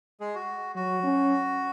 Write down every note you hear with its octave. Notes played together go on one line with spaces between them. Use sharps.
G#3 G#4
F#4
F#3 F#4
C#4